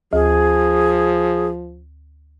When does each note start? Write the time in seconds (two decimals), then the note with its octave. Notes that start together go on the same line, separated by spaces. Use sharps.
0.13 D2 F3 G#4